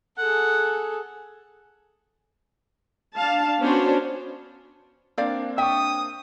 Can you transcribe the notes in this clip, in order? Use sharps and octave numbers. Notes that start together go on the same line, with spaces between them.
G#4 A4 F#5
D4 F5 A5
B3 C#4 D4 F#4 C5 C#5
A#3 C4 D4 C5 D5 F5
E5 G5 C#6 D#6